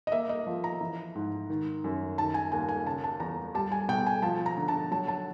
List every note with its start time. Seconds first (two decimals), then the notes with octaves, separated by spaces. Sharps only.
0.07 D#5
0.12 A#3 E5
0.29 D#5
0.47 F3
0.64 A#5
0.81 E3
1.15 G#2
1.50 D#3
1.84 F#2
2.18 D#3 A5
2.34 G#5
2.52 D#2 G#5
2.68 G#5
2.86 C#3 A5
3.04 A5
3.20 E2 A#5
3.54 G3 A5
3.72 G#5
3.88 B2 G5
4.06 G#5
4.22 F3 A5
4.46 A#5
4.57 D3
4.68 A5
4.91 F#3 A5
5.08 A5